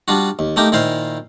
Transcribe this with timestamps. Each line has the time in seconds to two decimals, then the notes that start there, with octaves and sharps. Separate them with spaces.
0.08 G3 D4 F4 F#4
0.39 D#2
0.56 A3 A#3 D#4 G4 A#4
0.72 A#2 D#3 E4 C5 F5